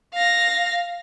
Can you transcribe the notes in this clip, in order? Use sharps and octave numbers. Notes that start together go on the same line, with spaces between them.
F5 A#6